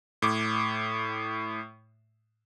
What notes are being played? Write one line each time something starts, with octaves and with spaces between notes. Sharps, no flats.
A2 D6